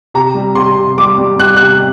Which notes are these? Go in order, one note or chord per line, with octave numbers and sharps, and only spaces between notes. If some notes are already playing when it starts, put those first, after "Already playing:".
C3 A#5
G3
C3 C6
C3
G3 D6
G3
G3 F#6
C3 F#6